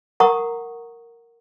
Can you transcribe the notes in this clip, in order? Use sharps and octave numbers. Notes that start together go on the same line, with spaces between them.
A#4 F#5 A#5 C#6 D#6